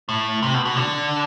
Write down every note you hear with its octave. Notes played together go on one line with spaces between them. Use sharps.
A2
C3
B2
B2
D3